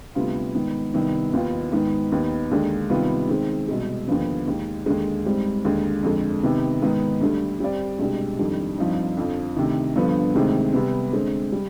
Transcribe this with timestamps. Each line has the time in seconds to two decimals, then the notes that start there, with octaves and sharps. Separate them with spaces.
0.15 D2 C3 G3 B3 F4
0.55 G#2 D#3 B3
0.94 C2 C3 D#3 B3
1.33 D#2 D#3 B3 F4
1.72 G#2 D#3 B3
2.12 D#2 D#3 B3
2.51 D#2 D3 G#3 D4
2.90 C3 D#3 G3 B3 F4
3.29 D#3 G#3 C4
3.69 C2 B2 G#3
4.08 D#2 D3 F3 B3
4.47 D#2 D#3 G#3
4.86 D#2 D3 G#3
5.25 G#2 G3 C4
5.65 D#2 D3 G#3
6.03 F2 D3 G#3
6.43 C3 D#3 B3
6.82 G#2 D#3 B3 D#4
7.21 D2 D3 G3
7.60 G3 C4 G4 D5
7.99 C2 B2 G#3 D4 G4
8.39 F2 D#3 G3 D4
8.78 G2 F3 C4 D#4
9.17 F2 D3 F3
9.57 D2 C3 D#3
9.96 G2 D3 F3 B3
10.35 D2 C3 D#3 G#3 C4
10.73 C3 G3 B3
11.13 D3 G#3 C4
11.52 G3